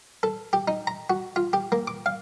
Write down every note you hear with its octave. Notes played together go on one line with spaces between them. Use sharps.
A4
G4
D#4
A#5
F#4
F4
G4
A#3
D6
F5